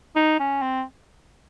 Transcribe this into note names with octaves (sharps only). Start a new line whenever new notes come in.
D#4
C#4
C4